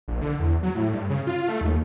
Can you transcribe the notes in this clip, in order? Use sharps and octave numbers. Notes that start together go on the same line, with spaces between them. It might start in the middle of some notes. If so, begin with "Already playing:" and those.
A#1
D3
E2
F#3
A2
G2
C#3
F4
A3
D#2